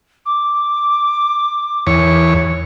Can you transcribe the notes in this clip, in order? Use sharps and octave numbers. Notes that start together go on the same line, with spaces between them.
D6
E2 C#5